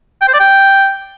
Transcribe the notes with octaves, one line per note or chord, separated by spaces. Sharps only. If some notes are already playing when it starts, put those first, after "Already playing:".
G5
C5
D5
G5